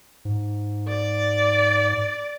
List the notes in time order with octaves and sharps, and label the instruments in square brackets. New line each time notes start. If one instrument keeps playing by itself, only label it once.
[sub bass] G#2
[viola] D5